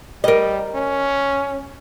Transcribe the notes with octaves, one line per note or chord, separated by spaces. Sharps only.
G3 A#4 D#5
C#4